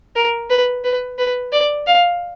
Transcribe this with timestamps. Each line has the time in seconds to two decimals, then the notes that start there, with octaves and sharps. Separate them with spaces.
0.16 A#4
0.50 B4
0.84 B4
1.18 B4
1.52 D5
1.87 F5